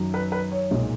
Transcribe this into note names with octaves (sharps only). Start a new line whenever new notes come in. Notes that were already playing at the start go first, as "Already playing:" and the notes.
Already playing: F#2 D#3 F#3
B4
B4
C#5
B1 A#2 G#3 D#4